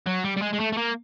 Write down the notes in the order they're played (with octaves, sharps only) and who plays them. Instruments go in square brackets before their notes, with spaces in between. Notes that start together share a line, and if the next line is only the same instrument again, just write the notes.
[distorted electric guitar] F#3
G3
G3
G#3
G#3
A3
A3
A#3